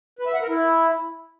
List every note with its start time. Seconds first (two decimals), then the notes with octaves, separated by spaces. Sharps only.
0.19 B4
0.27 E5
0.34 F#5
0.42 A#4
0.49 E4